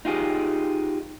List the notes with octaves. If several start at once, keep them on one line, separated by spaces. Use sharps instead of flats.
D#4 F4 G4 G#4